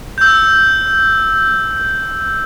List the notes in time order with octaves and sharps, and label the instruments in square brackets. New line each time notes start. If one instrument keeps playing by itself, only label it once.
[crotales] E6 G6